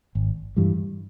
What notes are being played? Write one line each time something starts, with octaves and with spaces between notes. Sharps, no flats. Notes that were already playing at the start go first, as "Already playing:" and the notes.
G#1
G2 E3 G3